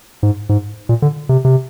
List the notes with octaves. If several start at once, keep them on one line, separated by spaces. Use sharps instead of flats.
G#2
G#2
A#2
D3
C3
C3